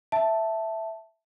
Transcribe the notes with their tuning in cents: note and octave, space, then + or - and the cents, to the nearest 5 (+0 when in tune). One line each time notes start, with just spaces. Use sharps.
E5 +0 A5 +0